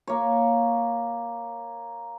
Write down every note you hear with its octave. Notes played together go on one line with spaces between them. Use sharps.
A#3 C#5